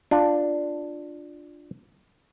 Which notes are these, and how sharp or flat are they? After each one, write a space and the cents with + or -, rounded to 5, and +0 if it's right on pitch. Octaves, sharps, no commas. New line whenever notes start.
D4 +5 F4 +0